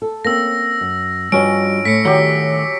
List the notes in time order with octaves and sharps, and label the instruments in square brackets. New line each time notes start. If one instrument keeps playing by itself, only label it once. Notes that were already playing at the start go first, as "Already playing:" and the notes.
[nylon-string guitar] A4
[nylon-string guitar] A#3 C4 C#4 [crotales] E6 A#6
[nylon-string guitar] F#2
[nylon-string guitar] G2 F3 D4 [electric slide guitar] G3 F#4 D#5 [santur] C#4 [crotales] D7
[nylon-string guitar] A2 [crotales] B6 C#7
[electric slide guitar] A2 D#3 A3 [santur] F#3 G4 [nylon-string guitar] G3